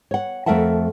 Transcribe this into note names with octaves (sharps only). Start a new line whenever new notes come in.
C#5 F#5
F2 A3 A#4 E5 F#5 A5